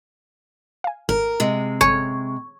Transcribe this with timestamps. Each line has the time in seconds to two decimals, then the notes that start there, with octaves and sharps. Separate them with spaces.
0.84 F5 G#5
1.09 G#1 A#4
1.40 C3 G#3
1.81 G1 C#5 G#5 D#7